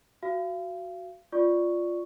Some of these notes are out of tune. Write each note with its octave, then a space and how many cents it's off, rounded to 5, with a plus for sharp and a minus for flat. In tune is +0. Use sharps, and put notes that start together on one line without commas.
F#4 +0 F5 -35
F4 +0 D5 +0 C#6 +0